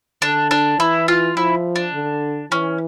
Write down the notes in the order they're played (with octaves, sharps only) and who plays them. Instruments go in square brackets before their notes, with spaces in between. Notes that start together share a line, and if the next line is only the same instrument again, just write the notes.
[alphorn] D3 [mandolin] D4
[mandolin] D4
[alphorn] E3 [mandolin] E4
[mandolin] F4
[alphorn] F3 [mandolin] E4
[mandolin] D4
[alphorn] D3
[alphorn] E3 [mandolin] C#4